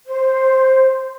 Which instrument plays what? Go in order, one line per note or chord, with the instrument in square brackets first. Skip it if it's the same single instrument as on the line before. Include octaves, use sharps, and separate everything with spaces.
[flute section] C5